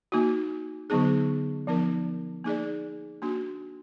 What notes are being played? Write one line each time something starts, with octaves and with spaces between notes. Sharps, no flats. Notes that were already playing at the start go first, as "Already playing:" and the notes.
A#3 D#4 F#4
D3 F#3 B3 D#4 G#4
F3 B3 D#4 A#4
A#3 D#4 G#4 D5
A#3 D4 F#4